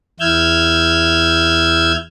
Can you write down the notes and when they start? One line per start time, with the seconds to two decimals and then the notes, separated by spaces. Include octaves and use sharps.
0.20 E2 E4 E6 F6 G6 G#6